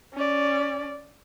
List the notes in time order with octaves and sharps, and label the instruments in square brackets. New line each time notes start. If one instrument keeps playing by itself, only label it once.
[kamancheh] C#4 D5